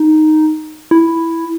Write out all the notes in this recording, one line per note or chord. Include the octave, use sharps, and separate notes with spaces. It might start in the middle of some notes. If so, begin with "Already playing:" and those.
Already playing: D#4
E4